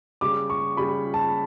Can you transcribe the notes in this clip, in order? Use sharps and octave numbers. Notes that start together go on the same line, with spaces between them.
C#3 G3 D6
C#6
C#3 G3 B5
A5